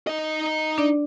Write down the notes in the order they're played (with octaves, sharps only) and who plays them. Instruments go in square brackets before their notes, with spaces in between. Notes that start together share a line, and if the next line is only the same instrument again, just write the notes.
[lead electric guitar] D#4 D#5
[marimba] D4 D5